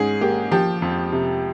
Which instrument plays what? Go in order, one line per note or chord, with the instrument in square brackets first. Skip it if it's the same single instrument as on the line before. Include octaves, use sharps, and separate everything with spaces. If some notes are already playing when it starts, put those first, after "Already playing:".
Already playing: [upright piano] G#2 C#4 G#4
A#3 G4
F3 G4
F2
C3